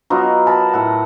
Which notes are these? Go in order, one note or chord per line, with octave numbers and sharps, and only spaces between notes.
F#3 B3 D#4 F4
A#4 A5 B5
A2 A4 F#5